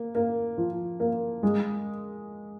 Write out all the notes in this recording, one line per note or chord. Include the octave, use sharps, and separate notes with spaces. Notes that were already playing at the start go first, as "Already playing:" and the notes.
Already playing: A#3
A#3
F3
A#3
G#3